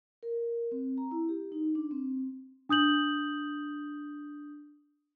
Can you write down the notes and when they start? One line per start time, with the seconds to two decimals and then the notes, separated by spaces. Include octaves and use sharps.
0.23 A#4
0.72 C4
0.98 A#5
1.11 E4
1.29 G4
1.52 D#4
1.75 D4
1.91 C4
2.69 D4 D#6 G6 F#7